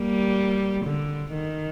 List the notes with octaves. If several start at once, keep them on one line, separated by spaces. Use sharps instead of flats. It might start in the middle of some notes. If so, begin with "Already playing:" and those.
Already playing: G3 A#3
D3
D#3